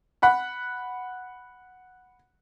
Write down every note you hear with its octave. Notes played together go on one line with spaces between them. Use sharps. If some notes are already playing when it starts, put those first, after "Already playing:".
F#5 B5 F#6